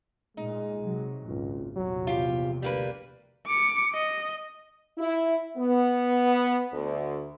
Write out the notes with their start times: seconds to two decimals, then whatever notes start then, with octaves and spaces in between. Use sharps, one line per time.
0.37 A#2 G#3 D#4
0.82 C3 F#3
1.27 G#1 C#2 A#2
1.76 A#1 E2 C3 F#3
2.07 F4 G4
2.62 D2 G3 A#3 B4
3.47 D6 C#7
3.94 D#5
4.98 E4
5.57 B3
6.72 D2